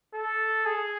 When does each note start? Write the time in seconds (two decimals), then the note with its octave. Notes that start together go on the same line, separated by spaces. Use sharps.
0.14 A4
0.66 G#4